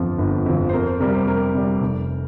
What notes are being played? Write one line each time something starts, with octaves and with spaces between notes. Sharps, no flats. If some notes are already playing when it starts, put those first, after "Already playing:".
Already playing: G1 F2 F3 F4
G1
F2 F3
C5
F2 A#4
C5
C3 G3 A#4
C5
F2 A#4
C3 G3
F1